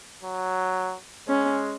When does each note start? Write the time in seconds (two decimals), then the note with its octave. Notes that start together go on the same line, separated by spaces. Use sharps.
0.23 F#3
1.28 G#3 C#4